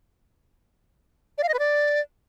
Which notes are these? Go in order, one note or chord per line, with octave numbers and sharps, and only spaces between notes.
D5
F5
D#5
B4
D5